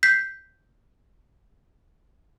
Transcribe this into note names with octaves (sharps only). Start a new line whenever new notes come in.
G6 B6 C7